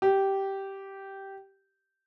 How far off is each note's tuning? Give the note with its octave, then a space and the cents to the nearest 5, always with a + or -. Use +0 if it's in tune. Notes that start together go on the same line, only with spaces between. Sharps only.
G4 -10